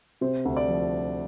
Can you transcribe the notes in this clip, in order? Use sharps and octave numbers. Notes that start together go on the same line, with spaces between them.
C3 C5
D2
D5
F3